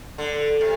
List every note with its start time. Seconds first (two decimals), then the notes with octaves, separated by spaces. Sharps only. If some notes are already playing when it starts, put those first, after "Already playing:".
0.18 D3
0.61 C3